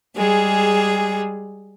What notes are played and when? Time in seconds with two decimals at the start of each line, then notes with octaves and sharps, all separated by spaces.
0.16 G3 G#3 G#4